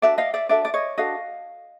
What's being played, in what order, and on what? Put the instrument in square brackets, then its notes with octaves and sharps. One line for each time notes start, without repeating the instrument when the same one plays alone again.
[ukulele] D4 F#4 A4 D5 E5
D#5 F5
D5 E5
D4 F#4 A4 D5 E5
D5
C#5 D#5
D4 F#4 A4 D#5 F5